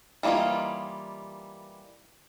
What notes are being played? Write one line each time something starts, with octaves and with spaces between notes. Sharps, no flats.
E3 G3 A#3 D#4 F4